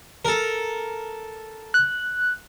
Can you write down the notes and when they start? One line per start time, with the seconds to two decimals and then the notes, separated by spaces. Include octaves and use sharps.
0.25 A4 A#4
1.74 F#6